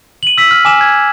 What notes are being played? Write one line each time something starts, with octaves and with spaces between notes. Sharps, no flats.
D#7 F#7
E6 B6
F6
G#5 D6 E7
G#6